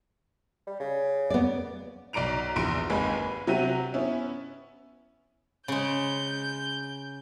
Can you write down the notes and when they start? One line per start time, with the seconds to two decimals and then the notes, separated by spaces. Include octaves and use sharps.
0.67 G3
0.80 C#3
1.30 B3 D5
2.13 B1 D5 A#5 D7 F7
2.56 A#1 E2 C6 D7
2.90 G#1 D#2 G#2 G#3 B4 G#5
3.15 B4
3.47 C3 F#3 G4 E5 F#5 D#7
3.94 B3 C#4 E4
5.68 C#3 G#3 G6